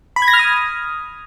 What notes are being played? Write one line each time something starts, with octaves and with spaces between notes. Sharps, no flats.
B5
G#6
A#6
F6
D#6